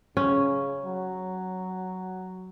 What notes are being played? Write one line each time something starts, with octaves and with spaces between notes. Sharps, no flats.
C#3 C#4
F#3